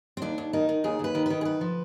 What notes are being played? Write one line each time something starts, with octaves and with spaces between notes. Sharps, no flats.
C4
D#2 D4
D#2
D#3 D#4
D#3
D#2 G#4
D#2 B4
D#3
D#3 B4
G#4
D2 B4
F3